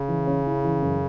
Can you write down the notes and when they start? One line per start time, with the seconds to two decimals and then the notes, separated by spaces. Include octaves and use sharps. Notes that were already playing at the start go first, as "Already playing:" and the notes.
Already playing: C#3
0.09 E3
0.27 C#4
0.46 E4
0.65 E3
0.82 F#2